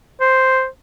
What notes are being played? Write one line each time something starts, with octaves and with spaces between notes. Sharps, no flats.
C5